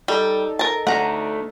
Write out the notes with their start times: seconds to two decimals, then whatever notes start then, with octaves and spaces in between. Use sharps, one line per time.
0.08 G3 D#4 A4
0.59 A#4 A5
0.87 A3 D4 F#5 A#5